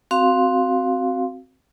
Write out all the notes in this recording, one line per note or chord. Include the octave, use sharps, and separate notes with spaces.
C4 F#4 F5 C6